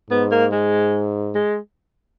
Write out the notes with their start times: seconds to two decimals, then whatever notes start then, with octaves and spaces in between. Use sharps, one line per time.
0.10 G#2 B3
0.31 A#3
0.52 G#3
1.35 G#3